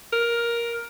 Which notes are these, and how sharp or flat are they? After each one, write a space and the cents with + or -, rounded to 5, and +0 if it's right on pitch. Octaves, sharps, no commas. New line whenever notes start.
A#4 +10